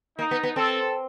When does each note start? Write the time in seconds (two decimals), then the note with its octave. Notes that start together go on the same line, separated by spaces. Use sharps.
0.18 A#3 D#4
0.31 B3
0.43 B3
0.56 C4 A4